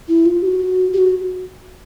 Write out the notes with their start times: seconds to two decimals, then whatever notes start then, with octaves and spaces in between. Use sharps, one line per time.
0.08 E4
0.26 F4
0.42 G4
0.46 F#4
0.93 G4
0.98 F#4